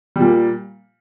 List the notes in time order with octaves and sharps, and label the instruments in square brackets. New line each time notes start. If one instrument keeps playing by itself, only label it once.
[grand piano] A#2 G3